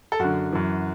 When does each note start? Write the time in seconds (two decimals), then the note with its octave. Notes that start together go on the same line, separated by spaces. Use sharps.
0.12 A4
0.19 F#2 D3 F#4
0.53 F#2 E3